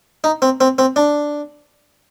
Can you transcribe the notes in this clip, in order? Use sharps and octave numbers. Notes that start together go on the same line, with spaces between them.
D#4
C4
C4
C4
D4